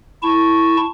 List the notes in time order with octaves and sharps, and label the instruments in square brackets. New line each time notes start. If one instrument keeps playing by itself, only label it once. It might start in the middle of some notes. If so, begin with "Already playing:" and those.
[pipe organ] E4 A5 C#6